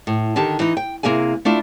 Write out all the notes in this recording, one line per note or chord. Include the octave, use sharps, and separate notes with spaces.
A2
D3 D#3 G4 A5
E3 D#4
G5
C3 A#3 E4 G#4 G#5
A3 D4 E4 F4